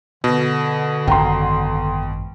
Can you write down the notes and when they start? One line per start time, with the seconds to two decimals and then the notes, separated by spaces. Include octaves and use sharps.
0.24 B2 D3
1.07 G#1 F#2 G5 A#5 C6